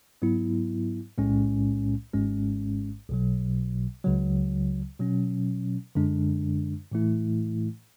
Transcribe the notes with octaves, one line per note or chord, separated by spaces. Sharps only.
G#2 F#3 B3 E4
B1 A2 G#3 C#4
G#1 G#2 G#3 C#4
B1 B2 F#3
C#2 C#3 F#3
B2 F#3 C#4
F#2 D3 G#3 D4
A2 E3 A3 E4